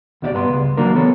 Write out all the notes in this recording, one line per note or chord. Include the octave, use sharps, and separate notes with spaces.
D2 B2 D4 E4 G4 D5
G2 B3 B5 C6
C#2
D3 F#3 A#3 D4 A#4
E3 B3 A4 C#5